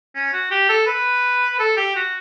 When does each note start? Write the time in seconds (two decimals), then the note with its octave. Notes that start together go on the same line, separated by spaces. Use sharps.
0.15 C#4
0.33 F#4
0.51 G4
0.69 A4
0.87 B4
1.59 A4
1.77 G4
1.96 F#4